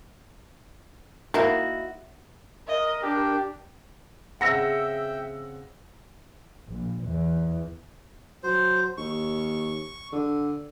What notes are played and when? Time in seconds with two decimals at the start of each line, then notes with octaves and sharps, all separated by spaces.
1.34 A#3 D#4 E4 F#4
2.67 A#4 D#5
3.03 D4 G4
4.41 C#3 C4 E5 F#5 G5 E6 A#6 C#7
6.69 A#1
7.06 E2
8.43 F#3 C5
8.97 D#2 C#6
10.12 D3